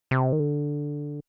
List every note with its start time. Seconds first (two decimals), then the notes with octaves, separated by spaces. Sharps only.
0.11 C3
0.33 D#3
0.40 D3